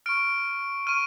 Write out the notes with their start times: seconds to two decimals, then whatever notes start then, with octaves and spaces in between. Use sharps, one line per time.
0.06 C#6 F6 D7
0.87 C#6 F6 D#7